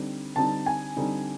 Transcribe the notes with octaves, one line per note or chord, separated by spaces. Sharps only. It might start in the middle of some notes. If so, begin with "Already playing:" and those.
Already playing: D3 G3 C4 D#4
D3 G3 C4 D#4 A5
G#5
D3 G3 C4 D#4